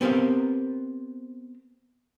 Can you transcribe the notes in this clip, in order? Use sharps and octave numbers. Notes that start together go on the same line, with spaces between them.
B3 C4 G4 A#4 F5